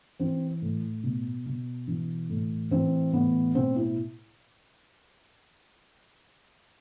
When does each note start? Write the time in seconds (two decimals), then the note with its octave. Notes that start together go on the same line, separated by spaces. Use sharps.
0.20 E3 C4
0.62 A2
1.03 B2
1.46 B2
1.88 E3
2.30 A2
2.71 E3 C4
3.13 A2 B3
3.55 B2 C4
3.76 E4